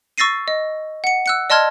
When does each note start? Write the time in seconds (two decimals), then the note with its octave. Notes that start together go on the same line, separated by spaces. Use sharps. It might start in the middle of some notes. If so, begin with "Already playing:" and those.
0.18 C#6 E6 A6 A#6 C7 D#7
0.48 D#5
1.04 F#5 C#7
1.26 E6 F#6 C#7
1.50 D5 D#5 A5 C6 F6 G#6